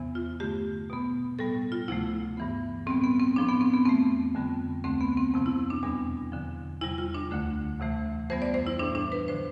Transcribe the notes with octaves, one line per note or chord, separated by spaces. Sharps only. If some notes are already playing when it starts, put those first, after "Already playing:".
Already playing: E2 C3 E3 B3
F4
G2 D3 A3 G4
B2 B3
A2 G3 B3 A4
F4
D2 C3 F3 A3 E4
G2 E3 B3
A2 G3 B3 C4
B3
C4
A2 F3 B3 D4
B3
C4
B3
F2 E3 A3 C4
F2 D3 G3 B3
D2 D3 A3 C4
B3
C4
F2 C3 F3 B3 C4
E4
D4
E2 B2 G3 B3 D4
E2 D3 F3
E2 C3 G3 E4
F4
D4
D2 D3 A3
D2 C3 E3 A3
F2 E3 G3 B3 C5
D5
C5
E4
A2 E3 G3 D4
D4
B4
D3 F3 C5